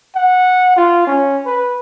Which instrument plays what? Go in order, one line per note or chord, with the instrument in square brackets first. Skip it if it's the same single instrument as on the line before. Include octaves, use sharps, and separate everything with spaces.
[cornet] F#5
F4
C#4
B4